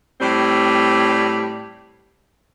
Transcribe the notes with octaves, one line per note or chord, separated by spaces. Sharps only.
A2 G3 C4